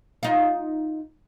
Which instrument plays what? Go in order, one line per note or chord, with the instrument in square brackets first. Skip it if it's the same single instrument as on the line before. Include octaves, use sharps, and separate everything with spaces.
[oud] D#4 F4